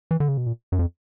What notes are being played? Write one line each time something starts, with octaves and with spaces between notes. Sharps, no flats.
E3
D3
C#3
B2
A#2
F#2
F2